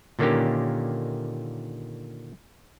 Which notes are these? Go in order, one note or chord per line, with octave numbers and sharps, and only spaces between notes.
A#2 D3 D#3 A#3 C#4 G4